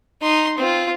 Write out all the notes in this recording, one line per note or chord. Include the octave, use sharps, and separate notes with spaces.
D#4 C6
C4 F4